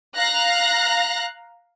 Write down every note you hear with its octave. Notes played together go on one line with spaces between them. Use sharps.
F5 A#5 F#6 A#6